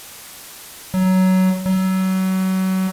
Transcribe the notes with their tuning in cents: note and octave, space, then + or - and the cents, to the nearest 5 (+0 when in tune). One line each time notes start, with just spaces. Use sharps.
F#3 +15
F#3 +30